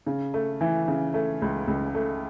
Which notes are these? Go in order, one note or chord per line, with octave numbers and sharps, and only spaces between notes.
C#3
A3
E3
C#3
A3
C#2
C#2
A3